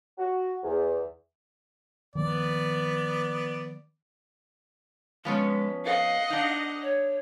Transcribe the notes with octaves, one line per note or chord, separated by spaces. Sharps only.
F#4
E2
D#3 F3 A#3 B3 D5
F3 G#3 B3 C#4
D#5 F5 F#5
D4 D#4
C#5